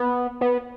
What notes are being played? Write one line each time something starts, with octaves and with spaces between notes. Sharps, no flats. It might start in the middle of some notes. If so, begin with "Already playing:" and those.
Already playing: B3
B3